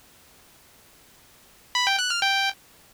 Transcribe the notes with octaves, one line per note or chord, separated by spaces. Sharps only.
B5
G5
F#6
F6
G5